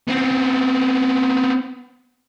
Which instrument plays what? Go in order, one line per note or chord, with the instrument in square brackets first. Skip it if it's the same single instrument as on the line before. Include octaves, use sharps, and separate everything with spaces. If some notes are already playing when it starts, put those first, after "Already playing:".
[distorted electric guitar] B3 C4